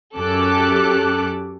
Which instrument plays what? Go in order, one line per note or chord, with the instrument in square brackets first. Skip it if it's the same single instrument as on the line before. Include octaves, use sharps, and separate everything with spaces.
[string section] F#2 C#4 G4 A4 D6 F#6